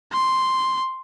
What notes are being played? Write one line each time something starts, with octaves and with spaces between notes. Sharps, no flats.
C6